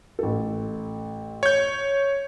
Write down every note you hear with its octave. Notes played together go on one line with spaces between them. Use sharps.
A1 A4
C#5 G6